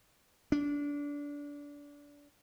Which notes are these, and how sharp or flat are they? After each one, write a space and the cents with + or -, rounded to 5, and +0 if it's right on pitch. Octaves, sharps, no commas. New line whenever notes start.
D4 -25